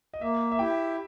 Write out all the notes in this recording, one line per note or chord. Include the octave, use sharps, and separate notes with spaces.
D#5
A#3 E5
E5
E4 G4 G5